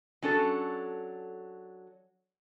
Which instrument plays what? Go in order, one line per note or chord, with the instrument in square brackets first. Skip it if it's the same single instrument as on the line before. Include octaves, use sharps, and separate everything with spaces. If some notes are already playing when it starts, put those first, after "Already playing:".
[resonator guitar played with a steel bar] F#3 C#4 D4 A4